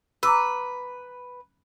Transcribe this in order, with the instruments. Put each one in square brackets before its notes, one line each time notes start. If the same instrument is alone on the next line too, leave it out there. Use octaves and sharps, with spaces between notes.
[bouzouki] B4 [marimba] A#5 D6 E6